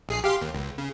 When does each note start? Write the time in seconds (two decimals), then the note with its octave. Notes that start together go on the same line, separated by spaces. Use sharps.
0.09 A#1 G#4 C7
0.24 G4 F5 C6
0.41 D#2
0.55 C#2
0.78 C#3